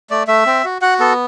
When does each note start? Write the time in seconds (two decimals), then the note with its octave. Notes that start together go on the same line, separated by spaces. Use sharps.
0.10 A3 D5
0.28 A3 E5
0.46 C4
0.64 F#4
0.82 F#4 F#5
0.99 B3 A4